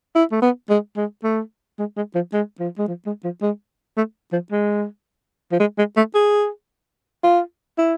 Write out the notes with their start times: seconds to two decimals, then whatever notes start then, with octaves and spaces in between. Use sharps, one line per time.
0.15 E4
0.31 A3
0.42 B3
0.70 G#3
0.97 G#3
1.24 A3
1.79 G#3
1.96 G#3
2.15 F3
2.33 G#3
2.60 F3
2.78 G#3
2.88 F3
3.06 G#3
3.24 F3
3.42 G#3
3.97 A3
4.32 F3
4.51 G#3
5.52 F3
5.60 G#3
5.78 G#3
5.97 A3
6.14 G#4
7.24 F4
7.78 E4